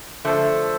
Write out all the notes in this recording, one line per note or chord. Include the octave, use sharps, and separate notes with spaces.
D3 F3 A3 A4 C5